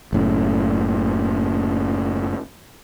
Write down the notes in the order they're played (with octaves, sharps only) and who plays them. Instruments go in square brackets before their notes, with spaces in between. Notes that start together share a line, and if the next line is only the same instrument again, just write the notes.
[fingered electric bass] F#1 A2 C#3